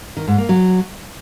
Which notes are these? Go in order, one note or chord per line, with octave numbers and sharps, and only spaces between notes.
D#3
G#2
A#3
F#3